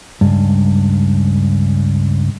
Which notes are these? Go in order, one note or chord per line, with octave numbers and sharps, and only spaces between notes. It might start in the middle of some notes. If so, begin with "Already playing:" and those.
C#2 G2